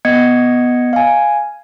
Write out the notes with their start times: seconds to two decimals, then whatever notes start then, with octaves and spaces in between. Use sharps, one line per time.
0.05 B3 D#5 G#6 C#7
0.93 F5 G#5